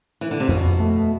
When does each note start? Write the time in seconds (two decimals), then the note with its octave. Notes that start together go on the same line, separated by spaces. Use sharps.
0.21 E3
0.31 D3
0.40 C3
0.49 F2 B2
0.80 A3